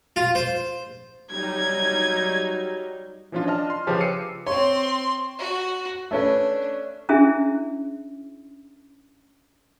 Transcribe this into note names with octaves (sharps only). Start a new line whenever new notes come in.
F4
C5
F#3 G3 D#4 G#6
E3 F3 C#4 D4 F4
D4 D#5 A5 F6
C6
C#3 F3 C#4 G4 B4 A5
D6 E6 C7 C#7 D#7
C4 C#5 C6
F#4
A3 C#4 D4 B4
C#4 D4 E4 G#4 E5